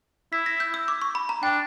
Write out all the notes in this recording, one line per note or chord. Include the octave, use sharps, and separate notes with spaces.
E4 B6
A#6
G6
E6
D6
C#6
B5
A#5
D4 G5